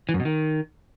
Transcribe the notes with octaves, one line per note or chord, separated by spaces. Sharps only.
E3
F#2
B2
D#3